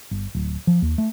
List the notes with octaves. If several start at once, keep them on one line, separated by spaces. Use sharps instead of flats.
G1
D1
F3
D#2
A3